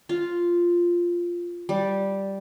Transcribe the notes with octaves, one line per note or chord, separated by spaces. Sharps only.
F4
G3